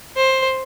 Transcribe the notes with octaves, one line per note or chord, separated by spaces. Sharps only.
C5